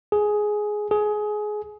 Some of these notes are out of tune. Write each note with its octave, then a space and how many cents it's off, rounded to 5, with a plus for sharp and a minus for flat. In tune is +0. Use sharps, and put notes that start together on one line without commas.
G#4 +10
G#4 +20